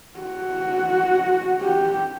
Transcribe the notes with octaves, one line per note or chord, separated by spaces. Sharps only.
F#4
G4